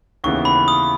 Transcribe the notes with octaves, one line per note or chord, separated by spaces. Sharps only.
D#2 C#3 E3 B3 C#6
B5
D#6